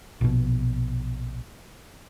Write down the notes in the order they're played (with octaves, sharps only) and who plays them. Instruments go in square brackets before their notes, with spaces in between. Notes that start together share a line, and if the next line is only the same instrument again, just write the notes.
[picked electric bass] A#1 B2